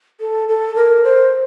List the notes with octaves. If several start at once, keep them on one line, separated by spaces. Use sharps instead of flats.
A4
A4
A#4
C5